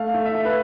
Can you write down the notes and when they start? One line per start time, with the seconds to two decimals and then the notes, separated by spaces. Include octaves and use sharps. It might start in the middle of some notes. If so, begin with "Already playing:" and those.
Already playing: A3 F5
0.14 A3
0.25 E5
0.35 A3
0.45 B4